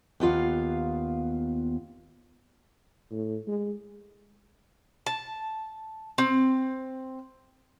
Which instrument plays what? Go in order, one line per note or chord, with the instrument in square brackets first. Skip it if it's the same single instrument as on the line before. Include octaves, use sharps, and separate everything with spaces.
[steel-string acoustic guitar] D#2 B3 F4 F5
[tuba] A2
G#3
[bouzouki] A5
C4